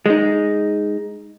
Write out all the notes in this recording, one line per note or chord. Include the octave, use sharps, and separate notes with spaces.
G#3 D#4